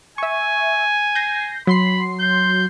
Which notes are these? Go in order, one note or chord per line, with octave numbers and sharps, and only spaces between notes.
E5 G#5 C#6
G6 A#6 C7
F#3 B5 C6 C7
G6